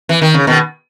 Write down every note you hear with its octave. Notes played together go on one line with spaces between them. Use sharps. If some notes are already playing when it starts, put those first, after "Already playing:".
E3
D#3
C#3
B2 D#3